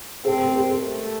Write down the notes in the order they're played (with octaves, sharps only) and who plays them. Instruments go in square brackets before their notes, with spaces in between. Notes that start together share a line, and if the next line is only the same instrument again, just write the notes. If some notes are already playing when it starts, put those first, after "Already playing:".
[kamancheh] C4 [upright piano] A4 C5
[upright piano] G4 A#4
G4 A#4
A4
[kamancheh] A3